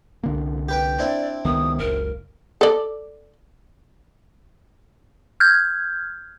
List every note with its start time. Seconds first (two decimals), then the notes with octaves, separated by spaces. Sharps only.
0.23 C2 D3 A#3
0.69 G4 B4 G5
0.99 C4 D4 E4 D5
1.45 C#2 D#3 B3 D#6
1.78 F#1 C#2 A#4
2.61 A4 D5
5.40 F6 G6 G#6